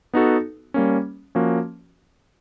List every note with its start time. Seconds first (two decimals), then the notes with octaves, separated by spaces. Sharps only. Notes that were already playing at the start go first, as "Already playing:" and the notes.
0.14 B3 D#4 F#4 A4
0.74 G3 A#3 C#4
1.35 F3 A#3 C#4 F#4